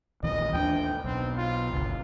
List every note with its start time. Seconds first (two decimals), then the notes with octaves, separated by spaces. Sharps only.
0.23 A#1 D#2 E3 D#5
0.53 D#2 G3 D4 G5
1.04 B1 C4
1.37 F4
1.73 G1 C#2